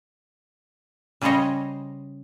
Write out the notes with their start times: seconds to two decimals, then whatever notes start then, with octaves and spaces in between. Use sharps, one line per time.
1.22 C#3 G3 G#4 C5 C#5 D#5